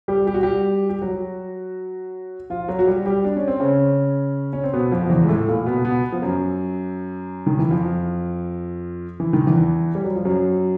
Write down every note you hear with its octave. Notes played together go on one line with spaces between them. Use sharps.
G3 G4
G4
F#4
G3 G4
G4
F#3 F#4
F3 F4
F#3 F#4
F#4
G3 G4
G3 G4
D4
C#4
C4
C#3 C#4
C#4
C4
B2 B3
F2 F3
E2 E3
G#3
A2 A3
A#2 A#3
B2 B3
B2 B3
F3
F#2 F#3
D#3
E3
F2 F3
E3
D#3
E2 E3
G3
F#3
F3
F#2 F#3